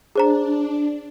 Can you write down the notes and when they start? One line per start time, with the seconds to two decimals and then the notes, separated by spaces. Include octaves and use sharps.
0.16 D4 G#4 C5 A#5